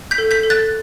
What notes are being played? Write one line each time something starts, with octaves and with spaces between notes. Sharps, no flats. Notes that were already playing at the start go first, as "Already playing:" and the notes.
G6 B6
A4
G6 B6
A4
F#6 A6